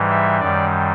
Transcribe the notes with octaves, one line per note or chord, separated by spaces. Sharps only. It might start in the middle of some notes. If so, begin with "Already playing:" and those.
Already playing: G#2 E3 G3
E5
F#2 D#3 G3 D5